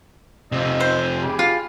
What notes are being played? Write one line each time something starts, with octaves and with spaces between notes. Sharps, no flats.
F2 C3 F3 D#4 E6
C5
G4 G#4 B5
F4